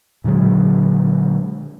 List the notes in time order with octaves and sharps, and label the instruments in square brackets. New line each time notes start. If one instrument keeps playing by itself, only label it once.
[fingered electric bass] A#2 D3 F#3 G#3